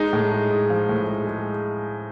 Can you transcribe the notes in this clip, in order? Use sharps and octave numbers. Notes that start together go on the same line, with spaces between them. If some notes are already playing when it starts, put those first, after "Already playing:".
Already playing: G#3 D#4
A2
G#3
G#3
F3
A2
G#3
G#3